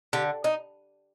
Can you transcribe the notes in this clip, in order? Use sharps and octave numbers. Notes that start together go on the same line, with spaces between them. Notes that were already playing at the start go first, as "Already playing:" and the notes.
D3 G4
D#4